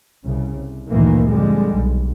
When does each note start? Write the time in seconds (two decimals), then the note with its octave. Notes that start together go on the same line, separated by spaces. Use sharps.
0.24 C2 C#3
0.56 C2
0.90 D2 G2 A#2 D#3 E3 A#3
1.28 F2 D3 G3 G#3
1.76 B1